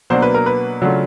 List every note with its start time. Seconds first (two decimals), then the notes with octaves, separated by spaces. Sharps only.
0.10 B2 F#3 A#3 D4 C5
0.22 B4
0.34 A#4
0.46 B4
0.82 C#3 F#3 A3 D4 F4